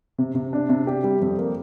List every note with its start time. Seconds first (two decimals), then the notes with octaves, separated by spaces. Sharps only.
0.18 C3
0.35 C3
0.53 D4
0.69 C3
0.87 G4
1.04 G3
1.21 F2
1.38 A#3